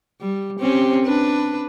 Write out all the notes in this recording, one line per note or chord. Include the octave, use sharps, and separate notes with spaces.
G3
C4 C#4 G4
D4 B4